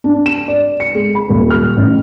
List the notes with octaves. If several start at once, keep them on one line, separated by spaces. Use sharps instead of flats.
D4
E7
D5
C#7
G#3
B5
D#1
F6
A1